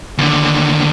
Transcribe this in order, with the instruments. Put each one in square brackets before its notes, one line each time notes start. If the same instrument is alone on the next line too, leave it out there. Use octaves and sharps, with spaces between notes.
[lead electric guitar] D#2 D3